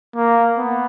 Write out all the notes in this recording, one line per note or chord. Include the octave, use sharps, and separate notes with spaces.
A#3
B3